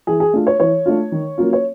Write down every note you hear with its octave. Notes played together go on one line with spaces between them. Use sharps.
E3 G#4
G#4
A3 D4 F4
C#5
E3 C#5
A3 D4 F4
D#3
F#3 A#3 C#4 F4
C#5